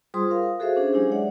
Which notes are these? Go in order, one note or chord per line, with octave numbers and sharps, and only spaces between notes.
G3 F4 G#4 C5 C6 D#6
A#4 F5
F#4 G#4 A4 C5 E5 F5
C#4 D4 G#4 C5
F#3 G#3 D4 E4 G4 G#4
C#5 D5 E5 F#5